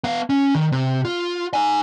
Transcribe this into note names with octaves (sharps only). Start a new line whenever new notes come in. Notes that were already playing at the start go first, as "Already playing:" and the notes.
B3 F5
C#4
D#3
C3
F4
D#4 G#5